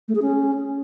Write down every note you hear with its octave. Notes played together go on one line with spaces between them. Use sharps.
A3
G#4
C#4